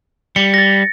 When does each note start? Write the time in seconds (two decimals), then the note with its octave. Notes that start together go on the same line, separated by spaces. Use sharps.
0.36 G3 C#7
0.54 A6 A#6